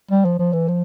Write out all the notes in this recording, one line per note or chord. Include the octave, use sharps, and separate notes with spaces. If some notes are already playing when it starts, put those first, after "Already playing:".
G3
F3
F3
E3
F3